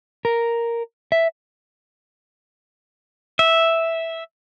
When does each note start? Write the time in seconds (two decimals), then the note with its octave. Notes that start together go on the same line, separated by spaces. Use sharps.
0.25 A#4
1.12 E5
3.39 E5